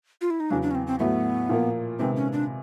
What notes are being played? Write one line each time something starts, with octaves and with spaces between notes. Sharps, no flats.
F4
E4
D#4
E2 C#3 F#3 D4
D4
C#4
C4
C4
A2 F#3 A3 B3
A#2 F3 A#3
C3 D#3 G#3 B3 C4
C#4
D4